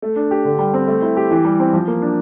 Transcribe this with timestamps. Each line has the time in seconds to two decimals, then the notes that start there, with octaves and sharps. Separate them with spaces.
0.02 A3
0.16 D4
0.31 G4
0.45 D3
0.59 G3
0.74 C4
0.88 A3
1.02 E4
1.17 G4
1.31 E3
1.45 G3
1.60 C4
1.73 F3
1.88 A#3
2.02 D4